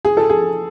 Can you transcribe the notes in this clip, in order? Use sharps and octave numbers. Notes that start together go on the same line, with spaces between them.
G#4
A4
G#4